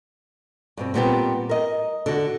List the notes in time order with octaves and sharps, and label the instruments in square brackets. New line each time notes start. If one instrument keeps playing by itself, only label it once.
[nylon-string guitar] G2 B2 C4
A#2 G3 B3 C4 F4 G4
A#4 D#5
D3 F#4